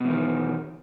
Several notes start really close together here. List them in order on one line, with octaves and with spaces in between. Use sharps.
B2 E2 D#3